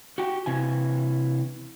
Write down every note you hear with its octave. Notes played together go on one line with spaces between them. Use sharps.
F#4 G4 G5
C3 E3 G#5